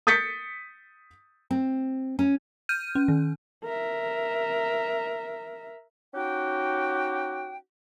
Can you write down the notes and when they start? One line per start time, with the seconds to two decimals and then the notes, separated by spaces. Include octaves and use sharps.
0.07 D#6 G6 A6 B6 C#7
1.51 C4
2.19 C#4
2.69 F6 G6 D#7
2.95 C#4
3.08 D#3
3.65 A#4 E5
6.14 C#4 D#4 F#4 G4 F#5 G5